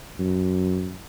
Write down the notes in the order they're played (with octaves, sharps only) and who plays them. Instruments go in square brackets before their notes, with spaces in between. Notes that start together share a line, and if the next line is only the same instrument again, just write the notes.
[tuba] F#2